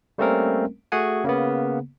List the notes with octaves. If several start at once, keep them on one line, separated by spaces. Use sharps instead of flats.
G3 A3 A#3 C4 C#4 A#4
A3 F#4 G#4 F#5 G#5
C#3 A#3 B3